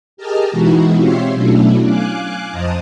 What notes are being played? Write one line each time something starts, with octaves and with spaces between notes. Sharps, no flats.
G4 G#4 A#4 D#5 A5 F6
B2 E3 G#3 D#4 E4 F#4
C4 F4 G4 C#5 E5 C6
B2 F#3 A3 C#4 D4 E4
F5 G#5 D6 F#6
F2 C5 D#5 A5 A#5 D#6